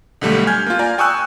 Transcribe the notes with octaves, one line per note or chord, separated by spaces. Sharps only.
B1 D3 G3 A3
G#5 F6 G6 G#6
A#3 F4
D5 F5 G#5 A#5
G5 G#5 C#6 D#6 E6 F#6